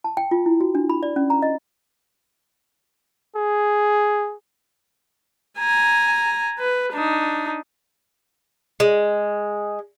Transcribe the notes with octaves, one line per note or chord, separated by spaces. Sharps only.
A5
G5
F4
E4
F#4
D4
B5
D5
C#4
A#5
D#5
G#4
G#5 A#5
B4
D4 D#4
G#3